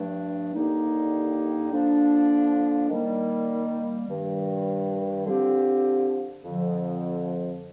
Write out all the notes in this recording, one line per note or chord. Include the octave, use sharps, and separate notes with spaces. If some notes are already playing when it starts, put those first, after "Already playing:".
Already playing: G2 F3 A3 D4
D#2 D3 G3 A#3 D#4
D3 F3 A#3 D4
D#3 G3 A#3
G2 D#3 G3
D3 F3 C4 G4
F2 D3 F3